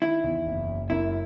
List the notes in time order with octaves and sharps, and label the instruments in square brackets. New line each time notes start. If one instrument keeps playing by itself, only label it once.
[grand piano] D#3 [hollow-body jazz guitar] E4
[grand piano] E2
F#1
F#1
[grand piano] F#2 [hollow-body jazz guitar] E4